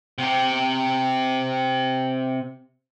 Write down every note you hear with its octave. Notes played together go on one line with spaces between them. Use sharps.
C3 G4